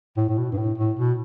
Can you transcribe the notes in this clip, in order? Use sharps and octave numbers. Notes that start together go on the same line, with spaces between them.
A2
A2
B2
G2
A2
A2
B2